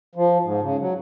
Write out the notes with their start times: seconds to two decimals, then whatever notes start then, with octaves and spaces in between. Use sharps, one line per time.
0.15 F3
0.44 G#2
0.62 C#3
0.80 F#3